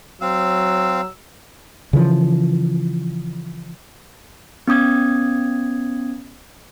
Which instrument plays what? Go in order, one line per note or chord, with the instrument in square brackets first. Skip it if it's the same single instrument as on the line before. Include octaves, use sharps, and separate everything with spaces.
[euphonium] F#3 [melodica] C4 F5 [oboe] E6
[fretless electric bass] C#3 E3 F3
[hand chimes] B3 C#4 D#6 G#6